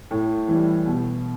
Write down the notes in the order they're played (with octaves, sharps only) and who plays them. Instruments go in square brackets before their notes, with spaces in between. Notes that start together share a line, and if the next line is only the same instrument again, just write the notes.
[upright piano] A2
E3 G3
B2